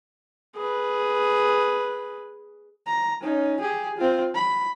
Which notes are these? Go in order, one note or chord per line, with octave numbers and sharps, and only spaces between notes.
G#4 B4
A#5
C#4 D#4
G4 G#4
C4 F4
B5